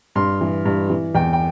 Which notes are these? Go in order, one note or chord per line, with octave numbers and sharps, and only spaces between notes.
G2 C6
E3
G2
E3
E2 G5
G5